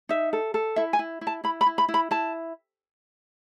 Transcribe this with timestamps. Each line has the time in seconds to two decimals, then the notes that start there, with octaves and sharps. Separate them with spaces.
0.09 D#4 E5
0.33 A4
0.54 A4
0.76 E4 E5
0.93 G#5
0.99 E4
1.21 E4
1.27 A5
1.44 E4 B5
1.61 B5
1.66 E4
1.78 B5
1.89 E4
1.94 B5
2.11 E4 A5